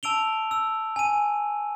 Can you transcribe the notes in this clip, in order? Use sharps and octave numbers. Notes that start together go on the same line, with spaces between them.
A5 E6 D7 F7 G7
E6
G#5 D#7